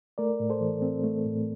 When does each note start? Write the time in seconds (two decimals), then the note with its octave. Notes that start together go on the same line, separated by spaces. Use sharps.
0.18 A3 A#4 D5
0.40 A2
0.50 A4 C5
0.61 E3
0.82 C4
1.04 A3
1.25 A2